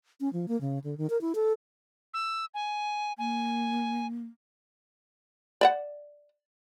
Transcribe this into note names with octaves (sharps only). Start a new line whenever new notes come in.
C#4
F3
A#3
C#3
D3
D#3
A#4
E4
A4
E6
G#5
A#3 G#5
D5 E5 F#5